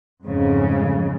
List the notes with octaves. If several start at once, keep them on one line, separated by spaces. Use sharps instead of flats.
F2 G#2 C#3